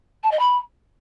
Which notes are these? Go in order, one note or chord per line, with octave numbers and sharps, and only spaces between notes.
A5
D#5
B5